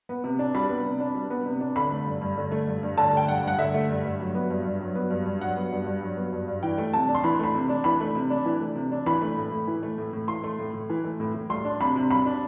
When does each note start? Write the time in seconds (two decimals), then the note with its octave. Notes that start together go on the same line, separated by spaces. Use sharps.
0.09 B3
0.24 C3
0.39 D4
0.54 G3 B5
0.69 B3
0.85 C3
1.00 D4
1.15 G3
1.30 B3
1.46 C3
1.60 D4
1.76 D3 B5
1.91 A3
2.06 G2
2.21 G2
2.37 D3
2.52 A3
2.67 G2
2.83 G2
2.97 D3 A5
3.13 A3 G5
3.28 G2 F#5
3.43 G2 F#5
3.58 D3 E5
3.74 A3
3.89 G2
4.05 G2
4.20 F#3
4.35 B3
4.50 G2
4.65 G2
4.81 F#3
4.95 B3
5.10 G2
5.26 G2
5.41 F#3 F#5
5.57 B3
5.72 G2
5.87 G2
6.02 F#3
6.17 B3
6.32 G2
6.48 G2
6.63 E3 G5
6.78 A3
6.93 C3 A5
7.09 D4
7.15 C6
7.24 E3 B5
7.39 A3 B5
7.54 C3
7.69 D4
7.84 E3 B5
8.00 A3
8.15 C3
8.30 D4
8.46 E3
8.61 A3
8.75 C3
8.92 D4
9.06 E3 B5
9.22 A3
9.37 A2
9.52 A2
9.68 E3
9.83 A3
9.98 A2
10.13 A2
10.28 E3 C6
10.44 A3
10.59 A2
10.74 A2
10.90 E3
11.04 A3
11.20 A2
11.34 A2
11.50 G3 C6
11.65 D4
11.80 C3 B5
11.96 C3
12.11 G3 B5
12.26 D4